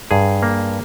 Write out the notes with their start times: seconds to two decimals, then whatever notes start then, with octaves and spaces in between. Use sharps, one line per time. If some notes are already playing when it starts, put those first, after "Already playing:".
0.11 G2 G#4
0.43 A#3